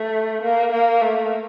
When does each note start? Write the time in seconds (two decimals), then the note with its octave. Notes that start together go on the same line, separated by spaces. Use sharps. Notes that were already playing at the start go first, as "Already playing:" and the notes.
Already playing: A3
0.42 A#3
0.72 A#3
1.01 A3